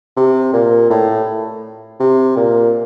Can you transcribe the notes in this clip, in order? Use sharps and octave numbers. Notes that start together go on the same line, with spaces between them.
C3
A#2
A2
C3
A#2